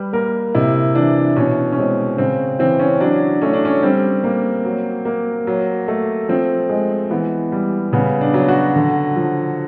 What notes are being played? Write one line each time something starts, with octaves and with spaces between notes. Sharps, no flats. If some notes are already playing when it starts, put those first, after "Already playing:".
Already playing: G3 B4
A#3 A#4
C3 E4
E3 D4
B2 C#4
C#4
G#3 C4
C#3 C4
E3 C4
C#4
F#3 D4
A3 C#4
D4
C#4
G3 C4
A#3
F#3
A#3
F#3
A3
F3 C4
G#3
E3 B3
G3
C#3 B3
D4
F#3
F#4
D3
F3